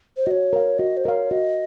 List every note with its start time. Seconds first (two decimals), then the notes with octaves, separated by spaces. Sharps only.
0.17 C5
0.26 F#4 C#5 D#5
0.53 A#4 F5
0.79 F#4 D#5
0.97 C5
1.05 A#4 C#5 D#5 F5
1.31 F#4 D#5